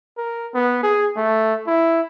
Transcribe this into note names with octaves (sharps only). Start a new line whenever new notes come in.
A#4
B3
G#4
A3
E4